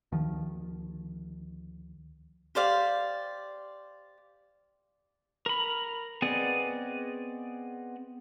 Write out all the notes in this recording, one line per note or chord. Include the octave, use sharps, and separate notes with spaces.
D2 D#3 F3
G4 C5 D5 F5
A#4 B5
B3 C4 G#4 D5 D#5